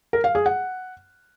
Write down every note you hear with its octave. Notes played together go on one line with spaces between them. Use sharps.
A#4
F5
G#4
F#5